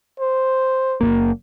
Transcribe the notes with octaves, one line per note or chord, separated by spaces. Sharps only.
C5
F#1 F#2 A#3